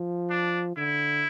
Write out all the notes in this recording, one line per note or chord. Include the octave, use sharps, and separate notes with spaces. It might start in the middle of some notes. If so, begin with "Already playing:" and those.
Already playing: F3
D4
D3 E4